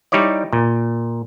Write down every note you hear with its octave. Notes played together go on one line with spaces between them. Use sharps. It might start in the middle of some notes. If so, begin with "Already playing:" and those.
G3 D#4 E4 C#5 D5
A#2